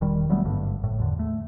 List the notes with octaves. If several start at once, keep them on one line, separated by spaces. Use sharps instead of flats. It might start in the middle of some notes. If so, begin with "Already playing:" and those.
E1 D#3 G3
F#3 G3 A3 B3
G#1 G2 D3
A2
E2 D3
A3